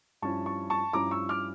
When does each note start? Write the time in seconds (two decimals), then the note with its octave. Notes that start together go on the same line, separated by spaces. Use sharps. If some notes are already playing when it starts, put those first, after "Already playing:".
0.22 G2 F3 C#4 E4 A5 C#6
0.46 A5 C#6
0.70 A5 C#6
0.93 G2 F3 C#4 E4 A#5 D6
1.11 C#6 E6
1.29 D6 F6